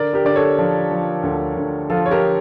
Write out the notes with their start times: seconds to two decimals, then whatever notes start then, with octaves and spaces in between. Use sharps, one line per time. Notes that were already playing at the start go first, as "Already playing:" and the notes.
Already playing: D3 A#4 D5
0.14 G4 A#4
0.25 D3 D5
0.36 A4 C#5
0.59 F3 D4
0.91 F3
1.23 D2
1.57 D2
1.90 F3 F4 A4
2.06 C#5
2.11 G4 A#4